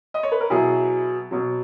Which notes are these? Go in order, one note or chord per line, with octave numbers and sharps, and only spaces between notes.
D#5
C#5
B4
A#4
B2 F#3 E4 G#4
B2 F#3